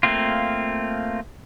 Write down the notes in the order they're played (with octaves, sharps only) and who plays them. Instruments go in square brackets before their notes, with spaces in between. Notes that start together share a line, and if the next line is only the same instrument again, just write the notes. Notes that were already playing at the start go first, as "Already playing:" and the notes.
[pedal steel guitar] A3 A#3 C4 F4